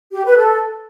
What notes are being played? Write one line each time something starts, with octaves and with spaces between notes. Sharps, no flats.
G4
B4
A4